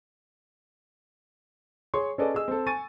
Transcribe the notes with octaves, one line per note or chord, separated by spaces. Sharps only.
G#4 C#5 C6 C#6
C#4 G#4 A4 B4 D5 D#5
G#4 D#5 E6
C4 A4
G#5 C#6 A6 D#7